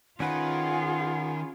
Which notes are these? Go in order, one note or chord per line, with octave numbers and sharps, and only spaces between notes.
D#3 C#4 F4 G#4 B4 F#5